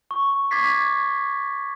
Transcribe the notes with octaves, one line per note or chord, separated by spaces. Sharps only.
C#6
C#6 D6 G#6 A6 B6 C7